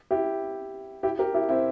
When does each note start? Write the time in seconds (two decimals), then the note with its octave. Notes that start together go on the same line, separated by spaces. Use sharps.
0.11 E4 G4
1.03 E4 G4
1.19 G4 A#4
1.34 E4 G4
1.49 C4 E4